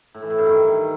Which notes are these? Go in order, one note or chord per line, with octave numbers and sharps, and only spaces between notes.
A2
E3
A2
G2
D#3